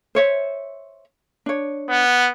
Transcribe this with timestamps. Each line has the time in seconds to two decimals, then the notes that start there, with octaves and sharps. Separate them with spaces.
0.15 C5 C#5 E5
1.46 D4 C#5
1.90 B3